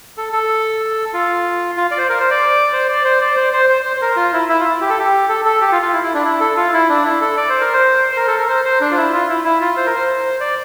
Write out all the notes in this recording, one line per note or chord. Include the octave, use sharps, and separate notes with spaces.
A4
A4
F4
F4
D5
C5
A#4
C5
D5
C5
D5
C5
D5
C5
C5
C5
C5
C5
A#4
F4
E4
E4
F4
E4
G4
A4
G4
A4
A4
G4
F4
F4
E4
E4
D4
E4
A4
F4
E4
D4
E4
A4
D5
C5
A#4
C5
C5
A#4
A4
A#4
C5
C5
D4
F4
E4
F4
E4
E4
F4
C5
A#4
C5
D5